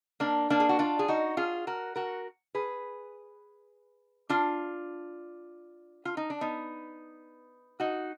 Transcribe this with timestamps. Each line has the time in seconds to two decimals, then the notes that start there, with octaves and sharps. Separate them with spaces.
0.20 A#3 D4
0.50 A#3 D4
0.60 G#4
0.69 F#4
0.79 D4 F4
0.99 G#4
1.08 D#4 F#4
1.37 F4 G#4
1.67 F#4 A#4
1.96 F#4 A#4
2.55 G#4 B4
4.29 D4 F4
6.05 F4
6.17 D#4
6.30 D4
6.41 B3 D#4
7.80 D#4 F#4